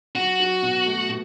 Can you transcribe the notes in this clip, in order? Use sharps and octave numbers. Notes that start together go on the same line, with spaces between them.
F#3 F#4
F#3
B2
A3
B2